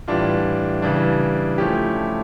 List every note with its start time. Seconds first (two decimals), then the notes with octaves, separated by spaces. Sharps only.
0.08 A2 E3 G3 D4 F4
0.82 C#3 E3 G3 D4
1.58 F3 A3 C#4 E4 G4